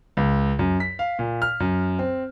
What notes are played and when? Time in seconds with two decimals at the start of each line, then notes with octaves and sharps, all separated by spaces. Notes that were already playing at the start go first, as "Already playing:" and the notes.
0.17 C#2
0.59 F#2
0.80 B6
0.99 F5
1.19 A#2
1.42 F6
1.60 F#2
1.99 C4